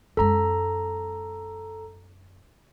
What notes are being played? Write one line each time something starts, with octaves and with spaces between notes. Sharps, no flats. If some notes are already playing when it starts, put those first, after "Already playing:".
F#2 G#3 A4 A#5